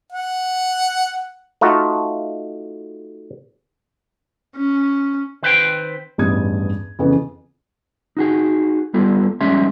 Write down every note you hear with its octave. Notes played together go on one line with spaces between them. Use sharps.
F#5
A3 D#4 F4 F#4
C#4
D#3 C4 B4 C5 F5 G5
A1 E2 G2 E4 D#6 G#6
F2 C#3 E3 B3 C#4
D#4 F#4 G#4
G3 B3 F4 A4
F2 G3 G#3 C#4 E5 C6